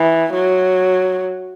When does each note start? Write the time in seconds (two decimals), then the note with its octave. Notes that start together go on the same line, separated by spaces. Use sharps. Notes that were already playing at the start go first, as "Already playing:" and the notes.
Already playing: E3
0.33 F#3